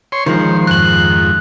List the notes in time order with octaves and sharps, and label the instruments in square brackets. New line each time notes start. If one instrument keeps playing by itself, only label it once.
[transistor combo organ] C#5 C6
[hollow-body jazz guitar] D#3 F3 G#3 [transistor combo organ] C5
[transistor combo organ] F2 G#2 [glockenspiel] F#6 F#7